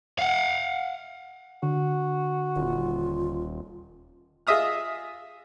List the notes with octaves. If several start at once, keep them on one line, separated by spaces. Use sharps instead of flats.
F5 F#5
D3 F#4
D#1 F4
F4 G#4 D#5 E5 D#6 F6